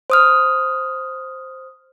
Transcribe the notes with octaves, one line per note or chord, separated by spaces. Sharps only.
C5 D#6 F6